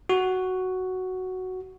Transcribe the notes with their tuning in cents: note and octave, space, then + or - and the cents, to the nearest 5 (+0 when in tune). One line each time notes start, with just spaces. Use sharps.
F#4 +5